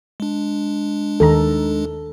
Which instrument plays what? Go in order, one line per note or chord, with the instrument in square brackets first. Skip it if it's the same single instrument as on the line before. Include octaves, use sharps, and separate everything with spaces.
[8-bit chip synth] G#3 D4
[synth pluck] D#2 D#3 A#5 [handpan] A4